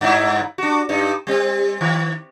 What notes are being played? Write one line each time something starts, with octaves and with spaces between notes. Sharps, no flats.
G2 D#4 E4
D4 F#4
G2 D#4
G3 C4
D#3